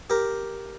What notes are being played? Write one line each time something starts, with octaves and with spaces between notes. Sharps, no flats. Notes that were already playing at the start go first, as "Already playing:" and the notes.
G4 A#4